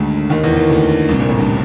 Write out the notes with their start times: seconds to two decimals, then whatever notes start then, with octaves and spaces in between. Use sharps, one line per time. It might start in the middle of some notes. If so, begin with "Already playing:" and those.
Already playing: G#1 D2 G#2 D3
0.30 D#2 D#3
0.43 E2 E3
0.56 D#2 D#3
0.70 D2 D3
1.09 C2 C3
1.19 A#1 A#2
1.28 A1 A2
1.38 G1 G2